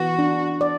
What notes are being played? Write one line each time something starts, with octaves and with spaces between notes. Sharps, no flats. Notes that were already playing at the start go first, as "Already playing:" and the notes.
Already playing: E3 B3 F#4
D4
D5